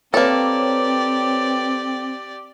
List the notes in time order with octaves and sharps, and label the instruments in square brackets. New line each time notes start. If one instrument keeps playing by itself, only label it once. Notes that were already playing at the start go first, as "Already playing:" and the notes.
[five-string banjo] A#3 A4 [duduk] C4 [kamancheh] G4 D5 [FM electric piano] B4 C#5